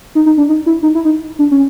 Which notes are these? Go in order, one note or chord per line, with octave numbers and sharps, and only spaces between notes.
D#4
D#4
D4
D#4
E4
D#4
E4
D#4
D4
C#4